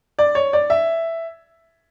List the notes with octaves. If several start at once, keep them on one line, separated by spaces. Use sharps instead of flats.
D5
C#5
D5
E5